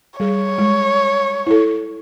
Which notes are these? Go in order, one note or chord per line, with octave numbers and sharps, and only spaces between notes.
G3 G#4 C#5
G#3
E4 A4